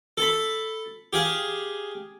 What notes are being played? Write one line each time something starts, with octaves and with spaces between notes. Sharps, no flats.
A4 A5 B5
G4 G#4 F5